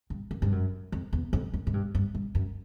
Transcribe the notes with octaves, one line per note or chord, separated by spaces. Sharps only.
G2
F#2
G2
F#2
F2
E2
F2
F#2
G#2
G2
G2
G2
F#2